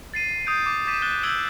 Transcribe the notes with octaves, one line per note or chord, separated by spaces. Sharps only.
A6 C7 D#7
D#6 G6 D7
D6
D6 D#6 A6 B6 D#7 E7
D6 F#6 A6 G7
E6 G6 G#6 D7 F#7 G7